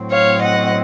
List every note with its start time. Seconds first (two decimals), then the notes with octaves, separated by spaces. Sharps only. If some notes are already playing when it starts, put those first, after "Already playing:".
Already playing: A2 F#3 C4
0.11 C#5 F5
0.42 D#5 F#5